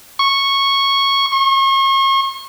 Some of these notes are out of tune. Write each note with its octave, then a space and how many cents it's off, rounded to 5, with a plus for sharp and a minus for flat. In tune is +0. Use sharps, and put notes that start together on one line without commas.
C#6 -10
C#6 -40